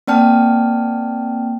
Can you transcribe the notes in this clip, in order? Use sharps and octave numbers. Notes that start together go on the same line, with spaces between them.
A#3 C4 D5 G5 A5 F6